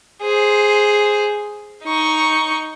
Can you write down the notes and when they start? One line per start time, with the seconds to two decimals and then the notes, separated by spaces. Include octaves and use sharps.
0.22 G#4 C5
1.84 D#4 C#6